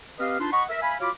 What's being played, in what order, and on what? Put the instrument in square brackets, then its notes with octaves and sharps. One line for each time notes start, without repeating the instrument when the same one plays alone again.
[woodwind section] C4 G4 B4 D#5 F5
D4 D#4 F4 B4 A5 C6
D#5 F#5 B5 C#6
A#4 E5
E5 F5 G#5 B5
F4 F#4 C#5 F5 B5 D6